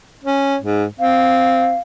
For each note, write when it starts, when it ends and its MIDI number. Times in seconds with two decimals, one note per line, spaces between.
0.24 0.57 61
0.62 0.85 44
1.00 1.74 60
1.00 1.77 77